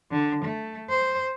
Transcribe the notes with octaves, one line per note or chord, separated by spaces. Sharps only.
D3
A3
C5